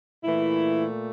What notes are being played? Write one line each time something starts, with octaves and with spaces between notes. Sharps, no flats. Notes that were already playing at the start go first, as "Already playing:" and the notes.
A#2 E3 A3 E4